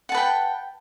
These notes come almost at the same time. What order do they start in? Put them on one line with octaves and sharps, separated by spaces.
F#5 A5 B4 G5